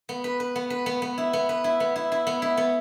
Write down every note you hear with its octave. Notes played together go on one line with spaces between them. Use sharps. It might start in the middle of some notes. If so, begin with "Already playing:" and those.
B3
B4
B4
B3
B4
B3
B3
E4
B3
B4
E4
B3
E4
E4
B3
E4
B3